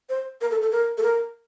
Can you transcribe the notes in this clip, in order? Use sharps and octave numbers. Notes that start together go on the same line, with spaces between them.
C5
A#4
A4
A4
A#4
A4
A#4